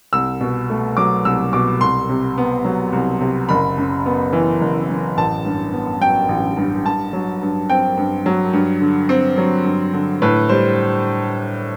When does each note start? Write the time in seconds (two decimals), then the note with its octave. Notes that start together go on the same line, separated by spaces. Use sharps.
0.13 C2 E6
0.41 B2
0.70 A3
0.97 F#3 D6
1.25 C2 E6
1.53 B2 D6
1.81 C2 C6
2.09 C3
2.38 B3
2.65 F#3
2.93 C2
3.21 C3
3.49 F#1 B5
3.78 F#2
4.06 B3
4.33 E3
4.61 F#1
4.90 F#2
5.17 A1 A5
5.45 G2
5.73 B3
6.01 F#3 G5
6.29 A1
6.57 G2
6.85 G2 A5
7.13 F#3
7.42 G2
7.70 C4 G5
7.97 G2
8.26 F#3
8.53 G2
8.81 D3
9.09 C4
9.38 F#3
9.66 G2
9.93 D3
10.22 A2 B4
10.49 G3 C5